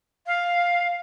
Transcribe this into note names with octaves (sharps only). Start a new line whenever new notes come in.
F5